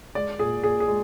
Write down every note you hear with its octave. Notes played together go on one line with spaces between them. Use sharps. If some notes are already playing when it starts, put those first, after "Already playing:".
G#3 D5
A#2 G#4
A#2 G#4
G#4
G#3